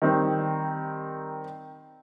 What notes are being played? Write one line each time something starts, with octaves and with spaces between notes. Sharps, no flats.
D#3 G3 C4 D#4